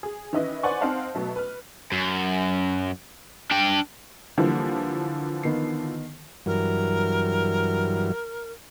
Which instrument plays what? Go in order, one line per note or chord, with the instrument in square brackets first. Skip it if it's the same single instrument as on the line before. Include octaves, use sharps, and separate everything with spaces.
[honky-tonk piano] G#4
D#3 E3 C#4 E4 B4 D#5
B4 C5 D5 F#5 G#5 C#6
C4 D#4 C5 F5 F#5 A5
B2 F#3 A3
B4 F6
[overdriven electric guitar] F#2
D4 G5
[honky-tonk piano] D3 E3 F3 [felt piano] G3 A#3
[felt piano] D#3 B3 C7
[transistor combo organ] G2 E3 F#3 [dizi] A#4